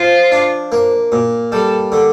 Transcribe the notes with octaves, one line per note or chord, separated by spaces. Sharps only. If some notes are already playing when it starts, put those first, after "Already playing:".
Already playing: F3 F4
D4
A#3
A#2
G3 A4
D3